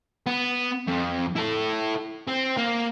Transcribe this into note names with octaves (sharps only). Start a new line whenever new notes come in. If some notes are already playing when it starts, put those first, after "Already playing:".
B3
F2
E4 A4
C4
A#3